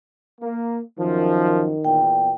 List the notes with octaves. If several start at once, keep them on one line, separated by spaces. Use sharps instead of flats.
A#3
F#2 D#3 F3
E2 A#2 G5